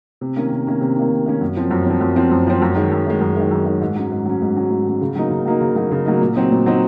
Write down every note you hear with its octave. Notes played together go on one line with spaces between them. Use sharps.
C3
D#3 A#3 C#4
C3
D#3 A#3 C#4
C3
D#3 A#3 C#4
C3
D#3 A#3 C#4
F#2
F3 C4
F#2
F3 C4
F#2
F3 C4
F#2
F3 C4
F#2
D#3 G#3
F#2
D#3 G#3
F#2
D#3 G#3
F#2
D#3 G#3
G#2
F#3 C#4
G#2
F#3 C#4
G#2
F#3 C#4
G#2
F#3 C#4
C#3
F#3 A#3 D#4
C#3
F#3 A#3 D#4
C#3
F#3 A#3 D#4
C#3
F#3 A#3 D#4
A#2
F#3 C4 D#4
A#2
F#3 C4 D#4